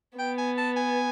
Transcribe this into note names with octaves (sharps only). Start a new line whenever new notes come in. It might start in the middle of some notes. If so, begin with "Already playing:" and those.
B3 G5
G#5
A5
G#5